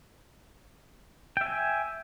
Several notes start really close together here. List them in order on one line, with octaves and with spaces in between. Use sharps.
G5 E5 G#5